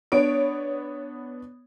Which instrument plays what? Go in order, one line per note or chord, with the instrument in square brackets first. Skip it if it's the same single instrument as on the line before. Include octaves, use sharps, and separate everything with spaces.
[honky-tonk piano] B3 D4 C#5 D7